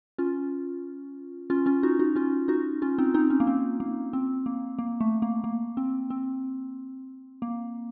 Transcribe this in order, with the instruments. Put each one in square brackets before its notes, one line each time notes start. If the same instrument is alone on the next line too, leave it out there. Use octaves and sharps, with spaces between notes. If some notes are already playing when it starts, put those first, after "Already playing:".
[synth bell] C#4 F4
C#4 F4
C#4 F4
D#4 F#4
D#4 F#4
C#4 F4
D#4 F#4
C#4 F4
C4 D#4
C4 D#4
C#4
A#3
C4
A#3
C4
A#3
A#3
A3
A#3
A#3
C4
C4
A#3